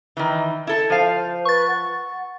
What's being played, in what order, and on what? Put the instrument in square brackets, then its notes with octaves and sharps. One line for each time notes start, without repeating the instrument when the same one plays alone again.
[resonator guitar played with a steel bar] D#3 E3
E4 A4
[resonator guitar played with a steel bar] F3 F5 [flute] C5
[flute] B4 [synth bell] C#6 A6
[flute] F#5